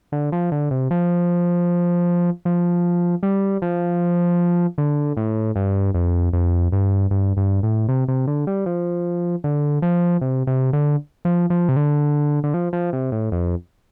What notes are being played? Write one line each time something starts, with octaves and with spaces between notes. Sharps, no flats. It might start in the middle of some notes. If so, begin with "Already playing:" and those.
D3
F3
D3
C3
F3
F3
G3
F3
D3
A2
G2
F2
F2
G2
G2
G2
A2
C3
C3
D3
G3
F3
D3
F3
C3
C3
D3
F3
F3
C3
D3
D3
F3
F3
C3
A2
F2